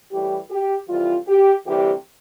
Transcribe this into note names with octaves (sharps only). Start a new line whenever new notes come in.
A2 E3 G3 G4
G4
F2 C3 E3 G3 F4
G4
D2 C3 E3 G3 G4